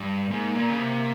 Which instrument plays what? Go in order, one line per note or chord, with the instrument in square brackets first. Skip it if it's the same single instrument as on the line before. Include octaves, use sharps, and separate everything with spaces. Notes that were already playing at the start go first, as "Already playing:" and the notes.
Already playing: [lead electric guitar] G2
[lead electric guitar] G#2 [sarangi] A#3
[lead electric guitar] A#2
C#3
C3